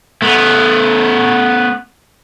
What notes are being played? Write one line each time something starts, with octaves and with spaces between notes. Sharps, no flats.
A3 B3